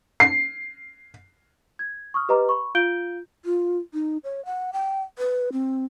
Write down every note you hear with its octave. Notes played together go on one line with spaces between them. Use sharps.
C7
G#6
C#6 D#6 F6
G4 B4 D#5 A#5 D6
B5 C#6
F4 F5 G6 D7 G7
F4
D#4
C#5
F#5
G5
B4
C4